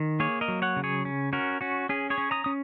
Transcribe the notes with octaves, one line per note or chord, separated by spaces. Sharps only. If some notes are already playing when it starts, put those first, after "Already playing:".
Already playing: D#3
A#3 G#4 C#5
A#4 D#5
F#3
C#5 F#5
C#3
G#4 C#5
C#4
C#4 F#4 A#4
C#4 F#4
C#4 G#4
G#4 C#5
C#4
A#5 D#6
C#4 D#6